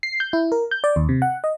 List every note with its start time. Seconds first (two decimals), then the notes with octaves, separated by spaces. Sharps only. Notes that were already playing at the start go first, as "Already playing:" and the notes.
0.03 C7
0.20 G6
0.33 E4
0.52 A#4
0.71 G6
0.84 D5
0.96 D#2
1.09 C3
1.22 F#5
1.44 D#5